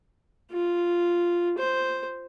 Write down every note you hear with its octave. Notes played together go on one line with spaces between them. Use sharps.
F4
C5